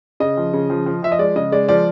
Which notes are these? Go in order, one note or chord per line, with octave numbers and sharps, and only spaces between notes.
C#3 D#5
F3
C#3
F3
F3
F3 E5
D#5
G#3 D5
C#3 D#5
G#3 D5
F3 D5